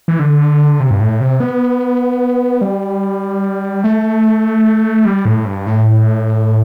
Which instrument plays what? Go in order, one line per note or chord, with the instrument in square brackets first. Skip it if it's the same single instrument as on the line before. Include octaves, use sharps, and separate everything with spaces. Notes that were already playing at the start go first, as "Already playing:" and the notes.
[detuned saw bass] E3
D3
C3
G2
A2
C3
B3
G3
A3
G3
A2
G2
A2